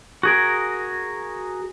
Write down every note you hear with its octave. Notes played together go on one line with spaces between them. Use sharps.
F#4 G#4 A#4